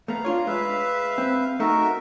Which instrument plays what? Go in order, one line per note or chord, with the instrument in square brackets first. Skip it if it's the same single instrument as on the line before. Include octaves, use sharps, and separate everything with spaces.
[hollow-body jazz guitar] A3 B3 [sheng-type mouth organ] F5 A#5
[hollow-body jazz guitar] D4 F4 C#5
[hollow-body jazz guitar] G#3 [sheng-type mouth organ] B4 E5 F5
[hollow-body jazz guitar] C4
[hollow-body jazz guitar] A3 D#4 A4 [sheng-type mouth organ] F#4 A#4 E5